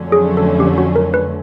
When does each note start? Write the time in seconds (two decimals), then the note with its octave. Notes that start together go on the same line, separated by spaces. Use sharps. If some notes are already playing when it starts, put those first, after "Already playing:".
Already playing: F2 D3 F#3 A3 C#4
0.12 G#4
0.37 A4
0.60 G4
0.78 F#4
0.96 A#4
1.14 B4